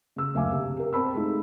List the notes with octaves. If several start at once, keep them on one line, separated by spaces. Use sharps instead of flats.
C#3 E6
F#1 D2 E5 F5 G#5 D6
C3
G4 A#4
C4 A5 B5 E6
G#3 A3 D#4 F4